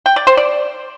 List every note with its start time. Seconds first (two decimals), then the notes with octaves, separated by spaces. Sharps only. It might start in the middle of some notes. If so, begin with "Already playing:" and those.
0.06 G5
0.16 D5
0.27 C5
0.37 D5